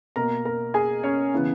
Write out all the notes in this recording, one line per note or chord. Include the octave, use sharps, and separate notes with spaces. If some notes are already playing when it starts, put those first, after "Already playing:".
B2 A#3 A#4 A#5
A#4 A#5
G#4 G#5
C#4 C#5
C#3 E3 B3